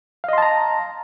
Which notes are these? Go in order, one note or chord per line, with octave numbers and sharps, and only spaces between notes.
D#5 F5 A5 A#5 C6